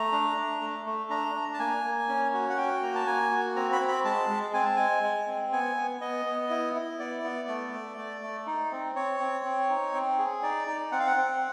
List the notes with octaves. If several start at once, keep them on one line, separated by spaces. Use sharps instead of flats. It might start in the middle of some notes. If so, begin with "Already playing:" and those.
Already playing: A3 A#5
D4
D4
A3
A3
D4 A#5
D4
A5
A#3 G#5
A#3
C#4
F#4
F#5
F#4 G5
A#3 A#5
A5
A#3 G#5
F#4
C4 A#5
B5
C4
B5
G#3 A5
G#3
C4 G#5
A5
G#3 G#5
G#3
C4
B3 G#5
B3
B3 D#5
B3
E4
E4
B3 D5
B3
A3
A3
A3
A3
D#4
C4
C4 C#5
C4
C4
D#4
C4
G#4
D#4 D5
D#4
C4 F#5
F5
F#5
C4